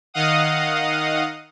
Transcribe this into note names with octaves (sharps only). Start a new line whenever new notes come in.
D#3 D#5 F5 F#5 D#6